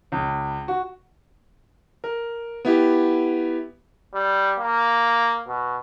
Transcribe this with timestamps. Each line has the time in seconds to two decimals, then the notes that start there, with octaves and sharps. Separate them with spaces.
0.12 C#2
0.68 F#4
2.04 A#4
2.65 B3 E4 G4
4.14 G3
4.59 A#3
5.48 B2